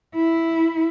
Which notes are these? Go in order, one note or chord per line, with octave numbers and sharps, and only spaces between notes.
E4